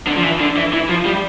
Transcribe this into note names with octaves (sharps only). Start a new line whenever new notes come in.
D3
F3
E3
D3
E3
E3
F3
G3